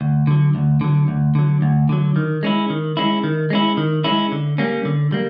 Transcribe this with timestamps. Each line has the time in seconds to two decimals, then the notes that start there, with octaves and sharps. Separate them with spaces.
0.01 D2
0.27 D3 F#3
0.55 D2
0.81 D3 F#3
1.08 D2
1.35 D3 F#3
1.62 D2
1.89 D3 F#3
2.16 D#3
2.43 G#3 C#4 E4
2.70 D#3
2.97 G#3 C#4 E4
3.24 D#3
3.50 G#3 C#4 E4
3.77 D#3
4.04 G#3 C#4 E4
4.32 D3
4.58 G3 A#3 C#4
4.85 D3
5.12 G3 A#3